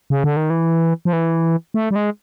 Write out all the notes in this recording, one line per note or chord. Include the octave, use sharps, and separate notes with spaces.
C#3
D3
D#3
E3
F3
E3
A3
G3
G#3